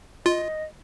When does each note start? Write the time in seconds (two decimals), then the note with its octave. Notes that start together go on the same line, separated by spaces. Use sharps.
0.26 F4 D#5